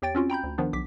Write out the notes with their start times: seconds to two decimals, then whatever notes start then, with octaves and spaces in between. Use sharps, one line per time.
0.02 E2 G4 C#5 G5 A6 D7
0.15 C4 C#4 F4 F#4
0.30 G5 A#5 B5 G6
0.43 D2
0.58 D#3 F3 B3 D4
0.73 B1 D6 B6